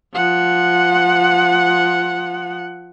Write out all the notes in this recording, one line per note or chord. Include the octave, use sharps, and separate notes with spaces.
F3 F#5